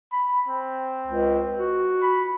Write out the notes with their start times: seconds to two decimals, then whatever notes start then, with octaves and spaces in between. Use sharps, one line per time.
0.12 B5
0.48 C4
1.07 C#2
1.56 F#4
2.02 B5